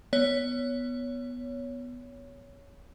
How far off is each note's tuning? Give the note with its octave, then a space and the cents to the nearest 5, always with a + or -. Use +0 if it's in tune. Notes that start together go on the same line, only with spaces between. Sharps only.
B3 +0 C#5 +15